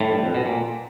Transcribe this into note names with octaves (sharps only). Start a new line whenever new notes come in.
A2
G2
F2
B2
A#2